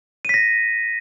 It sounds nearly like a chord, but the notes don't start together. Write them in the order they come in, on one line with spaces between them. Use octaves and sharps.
D#7 B6 A#6